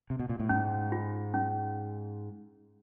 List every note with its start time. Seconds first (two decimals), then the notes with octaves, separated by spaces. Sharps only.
0.10 C3
0.19 B2
0.29 A#2
0.40 A2
0.49 G#2 C#4
0.92 F4
1.34 C#4